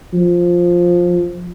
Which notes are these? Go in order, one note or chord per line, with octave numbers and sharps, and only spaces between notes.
F3